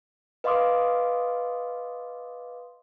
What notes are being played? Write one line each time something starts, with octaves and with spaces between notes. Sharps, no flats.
B4 D#5 F5 C6 D6 D#6